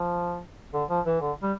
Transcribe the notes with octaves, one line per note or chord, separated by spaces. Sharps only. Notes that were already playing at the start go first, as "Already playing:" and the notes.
Already playing: F3
D3
F3
E3
D3
G3